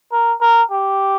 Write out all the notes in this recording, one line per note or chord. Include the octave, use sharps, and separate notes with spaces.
A#4
A#4
G4